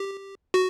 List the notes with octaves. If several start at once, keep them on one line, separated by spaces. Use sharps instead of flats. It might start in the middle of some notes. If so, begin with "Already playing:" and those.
Already playing: G4
F#4